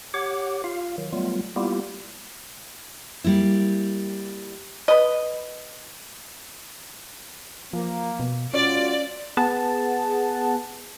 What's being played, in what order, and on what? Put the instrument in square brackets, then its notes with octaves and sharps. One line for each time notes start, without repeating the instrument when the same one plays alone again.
[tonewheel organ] G4 C#5 F#5 D6
F4 F5
D#3 F#3
F#3 G3 A3 B3 F4
G3 A#3 B3 E4 F4 G4
[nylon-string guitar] G3 A#3 E4
[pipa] B4 D#5
[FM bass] F3 [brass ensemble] A#3
[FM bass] B2
[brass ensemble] G#3 F4 F#4 [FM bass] C#4 [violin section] D5
[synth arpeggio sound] B3 G#4 F#5 A5